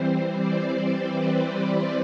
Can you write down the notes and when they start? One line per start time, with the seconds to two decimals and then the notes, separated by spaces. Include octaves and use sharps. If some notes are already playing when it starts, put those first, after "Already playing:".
Already playing: E3 G3 C4 C5
0.33 D5
1.05 B4